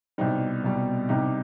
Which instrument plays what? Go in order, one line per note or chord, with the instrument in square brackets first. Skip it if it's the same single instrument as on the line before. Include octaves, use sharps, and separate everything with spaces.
[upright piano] C2 B2 G3 C4 D#4
C2 B2 G3
C2 C3 G3 D#4 G4